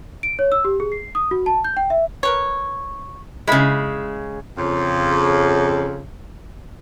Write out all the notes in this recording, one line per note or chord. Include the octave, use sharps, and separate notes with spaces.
D7
C#5
E6
G4
G#4
C7
D#6
F#4
A5
G6
G5
E5
A#4 B4 C#5
C#3 G#3 E4 B5
F2 C#3